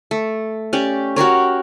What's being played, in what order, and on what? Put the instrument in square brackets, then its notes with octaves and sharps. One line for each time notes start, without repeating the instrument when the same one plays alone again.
[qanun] A3
C#4 G4 D5
F#4 G4 A#4 C#5